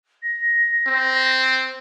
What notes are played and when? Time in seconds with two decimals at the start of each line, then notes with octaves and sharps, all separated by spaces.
0.22 A#6
0.87 C4